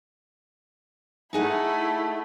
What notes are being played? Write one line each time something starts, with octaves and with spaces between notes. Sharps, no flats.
A3 D#4 E4 G#4 F#5